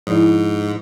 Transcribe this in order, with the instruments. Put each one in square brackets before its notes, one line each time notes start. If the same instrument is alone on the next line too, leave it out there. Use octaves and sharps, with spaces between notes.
[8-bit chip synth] G#2 [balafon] F3 E4